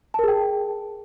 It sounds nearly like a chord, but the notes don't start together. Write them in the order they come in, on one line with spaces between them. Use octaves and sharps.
A5 A#4 G#4 G5